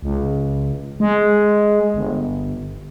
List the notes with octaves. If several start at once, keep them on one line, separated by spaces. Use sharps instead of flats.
C#2
G#3
G1